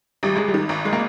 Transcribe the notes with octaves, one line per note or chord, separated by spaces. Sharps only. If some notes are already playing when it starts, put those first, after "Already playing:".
G#1 G3
G#1 G#3
G3
D#3
G#1
G#3
A#3